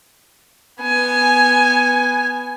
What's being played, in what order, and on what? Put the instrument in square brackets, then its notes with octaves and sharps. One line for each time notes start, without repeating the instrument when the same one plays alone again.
[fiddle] B3 [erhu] G#5